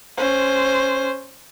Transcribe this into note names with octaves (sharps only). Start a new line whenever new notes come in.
C#4 C5